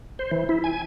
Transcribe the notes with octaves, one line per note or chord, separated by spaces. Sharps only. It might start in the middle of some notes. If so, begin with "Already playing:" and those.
C5
E3
E4
G#5